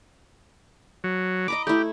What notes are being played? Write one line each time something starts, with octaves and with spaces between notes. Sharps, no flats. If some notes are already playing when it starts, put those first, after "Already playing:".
F#3
D#5 A#5 B5 D6
A3 E4 G4